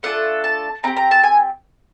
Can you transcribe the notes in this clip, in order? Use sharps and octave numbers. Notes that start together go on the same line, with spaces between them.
A3 D4 F4 A4 F#5
A5
C4 D#4 G4 A#5
A#5
A5
G#5